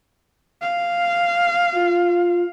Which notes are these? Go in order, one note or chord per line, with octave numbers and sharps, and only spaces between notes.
F5
F4